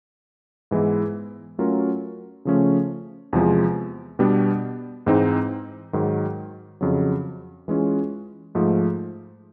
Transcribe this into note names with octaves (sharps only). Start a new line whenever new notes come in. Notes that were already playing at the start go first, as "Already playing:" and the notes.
G#2 E3 G#3 B3 E4
F#3 A3 C#4 F4 A#4
C#3 F3 A3 C#4
E2 C3 F3 G#3
B2 G3 B3 D4 G4
G#2 E3 G#3 C4 D#4
G#2 D#3 F#3
F2 C#3 F#3
E3 G#3 C#4 F4
G#2 F3 A3